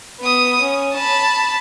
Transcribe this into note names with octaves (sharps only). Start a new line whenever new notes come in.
B3 D#6
C#4
A5 B5